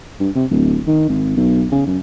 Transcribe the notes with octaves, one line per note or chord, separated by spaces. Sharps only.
G2
C3
D1
D#3
G#1
B1
C#3
F#2